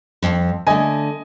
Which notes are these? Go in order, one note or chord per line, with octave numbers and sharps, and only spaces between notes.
F2
D3 A3 D#5 G#5